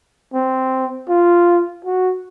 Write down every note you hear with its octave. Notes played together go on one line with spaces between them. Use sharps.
C4
F4
F#4